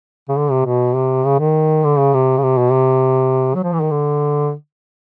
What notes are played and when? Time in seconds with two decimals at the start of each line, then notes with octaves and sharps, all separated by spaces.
0.29 C#3
0.37 D3
0.51 C3
0.66 B2
0.95 C3
1.25 C#3
1.40 D#3
1.84 D3
1.99 C#3
2.14 C3
2.38 C#3
2.43 C3
2.58 B2
2.72 C3
3.55 F#3
3.64 F3
3.73 E3
3.82 D#3
3.91 D3